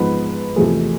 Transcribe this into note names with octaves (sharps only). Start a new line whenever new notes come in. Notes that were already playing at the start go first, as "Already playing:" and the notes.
Already playing: G#2 F3 B3 B4
E2 C3 F3 A3 G#4